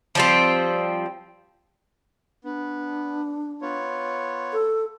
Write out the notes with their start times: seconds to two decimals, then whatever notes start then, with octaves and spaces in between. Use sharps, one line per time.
0.15 F3 G3 C4
2.44 B3 D4
3.62 B3 F4 C#5
4.53 A4